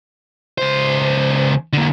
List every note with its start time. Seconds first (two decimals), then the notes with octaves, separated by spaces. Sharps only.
0.58 C#2 C5
1.73 D3 A#3